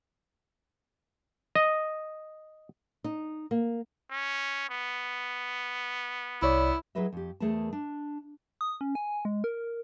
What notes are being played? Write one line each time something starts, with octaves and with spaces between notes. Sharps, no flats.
D#5
D#4
A#3
C#4
B3
C2 E4 C#5 D5
F#3 E4 G#4 B4 D#5 E5
F2 G4
E2 A3 G#4 A#4 D5 A5
D4
D#6
C#4
G#5
G#3
A#4